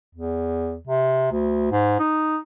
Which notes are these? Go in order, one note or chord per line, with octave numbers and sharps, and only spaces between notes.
E2
C3
D2
G#2
D#4